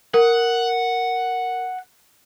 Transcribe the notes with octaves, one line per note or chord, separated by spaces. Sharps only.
A#4 F#5